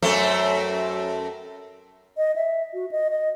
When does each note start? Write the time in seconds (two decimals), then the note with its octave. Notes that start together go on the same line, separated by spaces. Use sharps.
0.02 F#2 A3 C4
2.17 D#5
2.36 E5
2.74 F#4
2.91 D#5
3.10 D#5